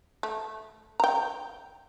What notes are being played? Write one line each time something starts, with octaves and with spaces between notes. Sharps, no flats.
A3
G5 A#5